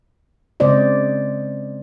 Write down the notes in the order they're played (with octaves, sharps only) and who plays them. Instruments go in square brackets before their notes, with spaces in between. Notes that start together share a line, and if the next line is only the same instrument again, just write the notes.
[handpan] C#3 G#3 C4 C5 D5 D#5